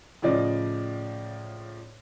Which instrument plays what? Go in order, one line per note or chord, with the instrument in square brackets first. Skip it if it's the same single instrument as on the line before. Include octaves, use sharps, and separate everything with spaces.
[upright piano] A2 C#3 F3 D5 D#5